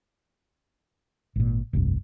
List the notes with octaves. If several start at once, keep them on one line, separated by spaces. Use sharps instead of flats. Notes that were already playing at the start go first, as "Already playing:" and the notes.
G#1 A#2
F1 C2 G2